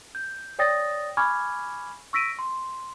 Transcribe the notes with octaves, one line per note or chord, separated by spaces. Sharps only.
G6
C#5 D5 G5 D#6 A6 A#6
G#5 B5 C#6 D6 F6 G#6
C#6 E6 A#6 B6 D7 D#7
C6